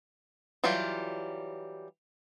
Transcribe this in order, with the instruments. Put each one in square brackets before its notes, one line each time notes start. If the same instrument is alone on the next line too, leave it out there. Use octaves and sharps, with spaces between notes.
[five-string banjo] E3 F#3 G3 F4 G4